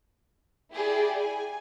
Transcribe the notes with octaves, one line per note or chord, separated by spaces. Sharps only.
E4 G4 G#4 D5
G#5